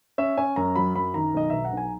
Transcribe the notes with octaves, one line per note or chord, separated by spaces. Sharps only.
C#4 E5
C#4 G#5
F#2 A#5
F#3 B5
F#2 B5
D#3 A#5
B1 D#5
B2 E5
F#5
B1
G#5